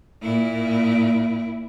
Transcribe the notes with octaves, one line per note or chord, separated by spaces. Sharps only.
A#2 E4